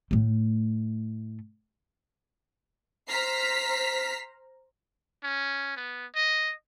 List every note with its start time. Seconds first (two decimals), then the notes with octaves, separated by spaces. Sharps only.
0.11 A2 A3
3.08 C5 A#5 F6 B6 C7
5.23 C#4
5.76 B3
6.15 D#5